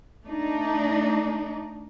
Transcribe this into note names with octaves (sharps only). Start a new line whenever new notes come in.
A3 D4 D#4